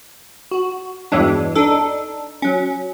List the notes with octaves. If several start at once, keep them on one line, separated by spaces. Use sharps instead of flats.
F#4
E2 G2 E3 F#3 G#3 D4
D4 D#4 A4
F#3 C#4